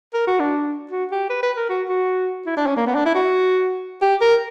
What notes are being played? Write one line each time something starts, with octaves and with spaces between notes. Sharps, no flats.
A#4
F#4
D4
F#4
G4
B4
B4
A#4
F#4
F#4
E4
D4
C#4
A#3
B3
D4
E4
F#4
G4
A#4